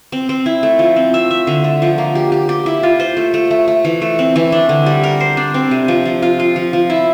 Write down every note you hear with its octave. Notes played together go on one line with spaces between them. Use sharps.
C4
C4
E4
A3
F3
C4
E5
E5
D3
A3
F3
A#3
G4
G4
G4
E4
F4
C5
A3
A3
A3
A3
E3
A3
C4
E3
D4
D3
G3
A#4
C5
D4
C4
C3
F3
F3
F4
F4
F3
F3
E4